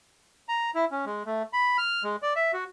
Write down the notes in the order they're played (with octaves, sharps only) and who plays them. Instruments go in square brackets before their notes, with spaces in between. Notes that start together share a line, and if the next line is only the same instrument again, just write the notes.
[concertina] A#5
E4
C#4
G#3
A3
B5
F6
G#3
D5
E5
F#4